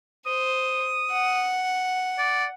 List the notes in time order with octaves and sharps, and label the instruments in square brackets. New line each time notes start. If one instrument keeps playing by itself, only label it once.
[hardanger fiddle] C5 [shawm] D#6
[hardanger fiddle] F#5
[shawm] D5